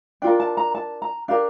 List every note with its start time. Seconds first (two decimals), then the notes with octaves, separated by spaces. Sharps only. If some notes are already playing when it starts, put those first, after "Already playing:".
0.22 D4 F4 A#4 G5
0.40 A5
0.57 A#5
0.75 A5
1.02 A#5
1.28 D4 G4 A#4 F5